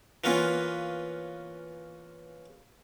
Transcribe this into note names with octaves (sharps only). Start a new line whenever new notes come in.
E3 A#3 B3 C#4 F4